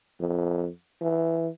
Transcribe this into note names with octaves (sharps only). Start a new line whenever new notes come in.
F2
E3